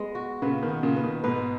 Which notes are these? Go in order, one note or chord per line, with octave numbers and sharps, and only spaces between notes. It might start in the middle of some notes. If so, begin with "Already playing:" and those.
Already playing: G#3 B3
F#4
A#2 C#3 B4
B2 D#3
B3
A#2 C#3
B4
B2 D#3
G#2 B2 B4